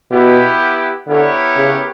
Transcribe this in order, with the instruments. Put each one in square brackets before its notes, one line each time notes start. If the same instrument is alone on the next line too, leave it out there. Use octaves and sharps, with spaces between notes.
[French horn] B2 [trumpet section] B3 E4 G4
[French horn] D3 [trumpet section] B3 E4 G4 A#4 C#5
[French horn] C#3